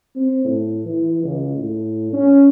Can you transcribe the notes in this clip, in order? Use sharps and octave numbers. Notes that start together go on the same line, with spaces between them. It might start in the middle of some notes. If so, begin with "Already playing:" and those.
C4
A2
E3
C#2
A2
C#4